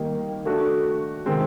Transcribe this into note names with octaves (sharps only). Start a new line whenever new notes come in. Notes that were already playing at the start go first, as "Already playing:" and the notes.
Already playing: D#3 G3 A#3 D#4
A3 D4 F#4
C3 D#3 G#3 C4